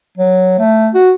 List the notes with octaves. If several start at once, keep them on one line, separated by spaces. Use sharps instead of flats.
F#3
A3
F#4